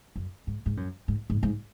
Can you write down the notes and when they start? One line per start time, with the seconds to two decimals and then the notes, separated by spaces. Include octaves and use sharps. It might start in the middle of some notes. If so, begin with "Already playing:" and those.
0.16 F#2
0.47 G#2
0.66 G#2
0.77 F#2
1.08 G#2
1.30 G#2
1.43 G#2